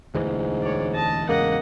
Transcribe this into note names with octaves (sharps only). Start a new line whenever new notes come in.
E1 D2 G#2 E3
C#5 D5
D#5 A5
E2 G#2 C#3 A#3 D#5 F#5